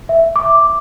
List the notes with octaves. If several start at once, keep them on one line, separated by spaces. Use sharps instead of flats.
E5
D6